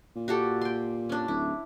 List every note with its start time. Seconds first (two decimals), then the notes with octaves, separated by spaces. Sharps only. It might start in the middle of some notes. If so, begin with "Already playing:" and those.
0.16 A#2
0.28 F#4 G4 A4
0.61 G5 C6
1.09 C#4 D4
1.28 D1 E4